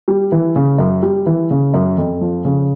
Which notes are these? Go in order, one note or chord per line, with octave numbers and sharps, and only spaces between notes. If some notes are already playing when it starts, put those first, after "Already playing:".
G3
E3
C#3
F#2
G3
E3
C#3
F#2
F2
F3
C#3